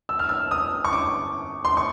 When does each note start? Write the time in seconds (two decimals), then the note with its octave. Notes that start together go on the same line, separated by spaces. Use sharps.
0.09 E6
0.19 F6
0.29 E6
0.51 D#6
0.85 C#6
0.93 D6
1.65 C6
1.77 C#6